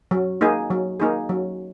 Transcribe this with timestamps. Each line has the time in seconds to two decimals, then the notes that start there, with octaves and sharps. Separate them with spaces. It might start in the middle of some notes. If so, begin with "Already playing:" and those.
0.11 F#3
0.41 A#3 D#4 G#4
0.71 F#3
1.00 A#3 D#4 G#4
1.29 F#3